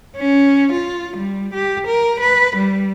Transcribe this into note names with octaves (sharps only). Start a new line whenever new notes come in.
C#4
F4
G3
G4
A#4
B4
G3